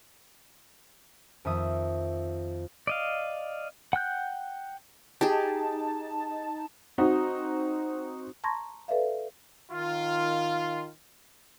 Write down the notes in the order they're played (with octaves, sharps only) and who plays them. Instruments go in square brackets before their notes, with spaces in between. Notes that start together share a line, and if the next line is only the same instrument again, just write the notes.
[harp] F2 D#3 E5 D#6
[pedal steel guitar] D5 D#5 F5
F#5 G5 F#6 G6
[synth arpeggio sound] D#4 A5 [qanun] G4 G#4
[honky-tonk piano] C4 D#4 F#4
[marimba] A5 A#5 C6 C#6 G#6 A#6
A4 B4 D5 E5 F5
[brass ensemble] D#3 F4